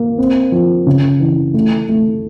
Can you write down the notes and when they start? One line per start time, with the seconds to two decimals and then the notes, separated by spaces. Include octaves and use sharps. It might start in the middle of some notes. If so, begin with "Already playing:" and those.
Already playing: A#3
0.18 C4
0.52 F3
0.86 C#3
1.20 E3
1.54 A3
1.89 A3